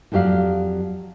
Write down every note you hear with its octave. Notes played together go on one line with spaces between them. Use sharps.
F2 F#3 G4 D5 F5